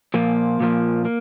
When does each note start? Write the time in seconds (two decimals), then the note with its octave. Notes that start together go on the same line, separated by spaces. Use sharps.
0.14 A#2 F3 A#3 F4
0.60 A#2 F3 A#3
1.05 A#3